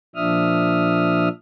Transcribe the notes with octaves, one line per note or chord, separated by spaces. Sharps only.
A#2 F3 D4 E5 D#6 F6